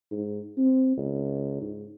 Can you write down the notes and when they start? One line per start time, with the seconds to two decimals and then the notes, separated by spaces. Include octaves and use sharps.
0.11 G#2
0.57 C4
0.97 C#2
1.61 G#2